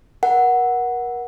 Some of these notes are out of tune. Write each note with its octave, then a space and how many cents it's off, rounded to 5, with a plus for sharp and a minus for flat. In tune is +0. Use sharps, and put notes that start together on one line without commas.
A#4 +35 F#5 +0